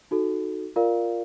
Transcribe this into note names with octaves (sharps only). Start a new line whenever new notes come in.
D#4 F#4 A4
F4 A#4 D5 F5